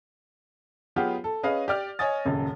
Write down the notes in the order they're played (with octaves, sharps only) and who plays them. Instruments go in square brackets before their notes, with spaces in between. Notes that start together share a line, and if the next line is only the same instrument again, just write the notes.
[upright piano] F#3 B3 F4 G4 G#4
A4
C#4 G#4 B4 D#5 F5
G4 D5 F6
C#5 D#5 G#5 D#6 A6
D#1 C#2 F#2